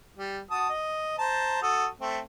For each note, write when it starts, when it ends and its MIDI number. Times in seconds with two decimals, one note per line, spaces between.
0.18 0.40 55
0.50 0.69 66
0.50 0.69 81
0.50 0.69 87
0.69 1.14 75
1.18 1.62 72
1.18 1.62 81
1.18 1.62 82
1.62 1.87 66
1.62 1.87 69
1.62 1.87 87
2.01 2.19 57
2.01 2.19 60